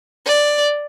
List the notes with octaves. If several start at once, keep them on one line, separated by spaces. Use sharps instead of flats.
D5